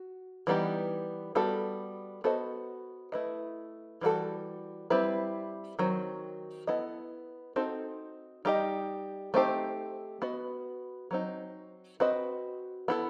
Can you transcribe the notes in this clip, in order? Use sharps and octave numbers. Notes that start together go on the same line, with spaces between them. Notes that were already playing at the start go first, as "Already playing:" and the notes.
Already playing: F#4
E3 G3 B3 D#4 G4
G3 B3 F#4 A4
B3 F#4 A4 C5 D#5
A3 E4 B4 D#5
E3 G3 C4 F#4 A4
G3 C4 E4 B4
D#3 F#3 C4
B3 E4 A4 D#5
C4 D#4 F#4 A4
G3 D#4 G4 D#5
A3 C4 D#4 G4 C5
B3 F#4 B4 D#5
F#3 C4 D#4
C4 F#4 B4 D#5
B3 E4 A4